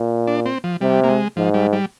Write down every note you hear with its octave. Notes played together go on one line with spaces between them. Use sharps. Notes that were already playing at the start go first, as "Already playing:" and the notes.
Already playing: A#2
D4
C4
F3
C3 G3
A#3
G#3
G#2 F3
G3
G3